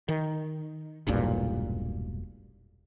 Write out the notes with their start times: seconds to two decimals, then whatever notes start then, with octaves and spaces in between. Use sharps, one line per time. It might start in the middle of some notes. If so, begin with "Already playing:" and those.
0.08 D#3
1.07 E1 B1 G2 A#2